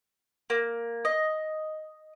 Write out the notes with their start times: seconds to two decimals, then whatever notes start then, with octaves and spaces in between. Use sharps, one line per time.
0.50 A#3
1.05 D#5